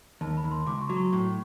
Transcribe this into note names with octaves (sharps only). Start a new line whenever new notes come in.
D#2 A5
B5
D#2
C6
C#2 D6
C#6
F#3
C#6
A2 C#6